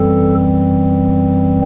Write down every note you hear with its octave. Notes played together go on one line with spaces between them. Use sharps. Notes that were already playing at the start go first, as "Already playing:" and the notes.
Already playing: F#2 E3 G3 C4 A4